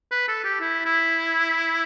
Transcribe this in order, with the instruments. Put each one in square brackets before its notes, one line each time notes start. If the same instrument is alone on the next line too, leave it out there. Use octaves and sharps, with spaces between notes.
[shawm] B4
A4
G4
E4
E4